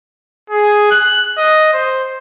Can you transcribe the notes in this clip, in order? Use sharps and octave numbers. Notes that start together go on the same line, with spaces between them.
G#4
F#6
D#5
C5